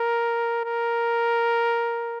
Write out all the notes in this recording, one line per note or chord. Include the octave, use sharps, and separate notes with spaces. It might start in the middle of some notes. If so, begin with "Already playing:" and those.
Already playing: A#4
A#4